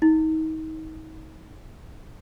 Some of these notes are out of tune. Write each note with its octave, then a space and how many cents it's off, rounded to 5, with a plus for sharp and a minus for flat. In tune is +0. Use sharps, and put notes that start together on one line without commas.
D#4 +30